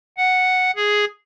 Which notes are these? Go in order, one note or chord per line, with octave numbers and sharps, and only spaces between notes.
F#5
G#4